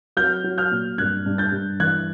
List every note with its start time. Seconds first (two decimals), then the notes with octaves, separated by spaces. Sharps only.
0.17 F#3 F6 G6
0.44 F#3
0.58 F6 G6
0.71 A#2
0.98 G2 F#6 G#6
1.26 G2
1.38 G6 A6
1.52 G2
1.80 E3 F#6 G#6